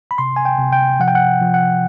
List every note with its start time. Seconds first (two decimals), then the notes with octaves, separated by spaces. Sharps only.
0.11 B5
0.18 C3 C6
0.36 G#5
0.45 G5
0.59 C3
0.72 G5
1.00 F3 F#5
1.08 G5
1.15 F#5
1.41 F3
1.54 F#5